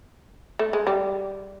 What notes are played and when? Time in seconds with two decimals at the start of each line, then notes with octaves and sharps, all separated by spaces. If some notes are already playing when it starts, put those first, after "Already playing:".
0.59 A3
0.73 G#3
0.87 G3